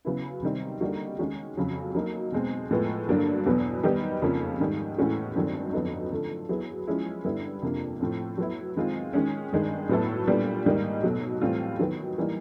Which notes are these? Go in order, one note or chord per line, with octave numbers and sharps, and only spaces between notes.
C#3 F#3 B3 E4
C3 D#3 G3 C4 D#4
D3 G3 A#3 D#4 F#4
D#3 G#3 C#4 F#4
F2 C#3 F#3
F#3 A#3 D#4
B2 G#3 C4
A2 F3 G#3 B3
G2 D3 F#3 A#3 D4
E2 B2 F#3 B3
D#3 G3 B3 D#4 G4
F2 C#3 F3 A#3 C#4
G#2 D#3 G3
A2 E3 G#3 C#4 F#4
G2 D#3 F#3 A3 C4
F2 D3 F#3 B3 D#4
D3 F3 A3
F#3 B3 E4 G#4
F3 G#3 C#4 E4 G#4
G2 D3 G3 B3 E4
F2 C3 F3 A#3 D4
A2 F3 A3 C4
F#3 B3 E4
D#3 G#3 C4 F4
D#3 G#3 C#4
G2 D#3 G#3
A2 F#3 B3 E4 A4
A#2 G3 B3 D4
G#2 D#3 G3 A#3 D#4
B2 F#3 A3
A2 E3 G3 C4 F4
D#3 F#3 B3
E3 G3 A#3 D#4